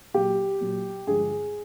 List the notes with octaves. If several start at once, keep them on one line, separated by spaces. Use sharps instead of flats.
A#2 F#3 G4
A#2 F#3
G2 D3 F3 G#3 G#4